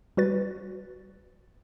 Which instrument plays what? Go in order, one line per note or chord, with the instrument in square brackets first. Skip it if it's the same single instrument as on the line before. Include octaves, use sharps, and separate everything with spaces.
[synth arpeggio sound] G3 F#4 B4 A6